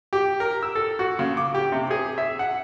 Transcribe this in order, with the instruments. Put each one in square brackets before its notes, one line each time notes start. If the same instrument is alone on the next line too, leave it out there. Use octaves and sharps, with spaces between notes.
[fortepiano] G4
A#4
E6
A4
F#4
C#3
D6
G4
C3
G#4
E5
F#5